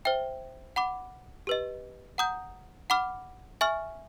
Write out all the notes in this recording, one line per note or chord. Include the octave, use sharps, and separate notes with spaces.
C5 E5 G5
F#5 B5 D6
G4 B4 D#5
F#5 A#5 D#6 G6
F#5 B5 D6 F6
E5 G#5 C#6 F6